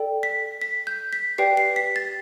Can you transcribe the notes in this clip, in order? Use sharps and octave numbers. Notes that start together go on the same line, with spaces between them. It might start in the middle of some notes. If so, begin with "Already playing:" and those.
Already playing: A4 D5 G5
B6
B6
G6
B6
G4 B4 D5 G5 C7
C7
B6
A6